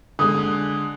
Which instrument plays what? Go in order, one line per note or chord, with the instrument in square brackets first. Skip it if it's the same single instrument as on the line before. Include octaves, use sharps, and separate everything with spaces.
[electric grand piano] D3 G#3 [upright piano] D#6